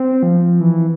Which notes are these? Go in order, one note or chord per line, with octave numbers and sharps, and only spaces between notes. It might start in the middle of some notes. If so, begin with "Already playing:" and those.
Already playing: C4
F3
E3